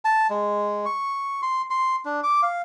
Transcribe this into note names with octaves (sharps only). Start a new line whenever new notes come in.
A5
G#3
C#6
C6
C6
D4
D6
F5